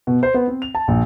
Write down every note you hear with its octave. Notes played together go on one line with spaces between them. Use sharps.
B2
C5
B3
C4
F7
A5
A#1